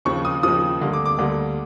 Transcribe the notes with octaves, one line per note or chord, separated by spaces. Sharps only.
D#2 C#3 F3 C#6
D#6
D#2 C#3 F3 D#6
D2 D3 G3 A#3
D6
D6
D2 D3 G3 A#3